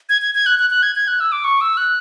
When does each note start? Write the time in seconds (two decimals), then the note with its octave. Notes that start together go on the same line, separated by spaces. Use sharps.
0.09 G#6
0.22 G#6
0.35 G#6
0.46 F#6
0.59 F#6
0.70 F#6
0.83 G#6
0.96 G#6
1.08 F#6
1.20 E6
1.32 D6
1.44 C#6
1.61 E6
1.77 F#6